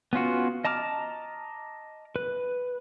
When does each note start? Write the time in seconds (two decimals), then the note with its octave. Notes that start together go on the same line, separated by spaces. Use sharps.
0.13 B3 C#4 F4 F#4
0.64 D#5 A5 A#5 D6 F6
2.16 B4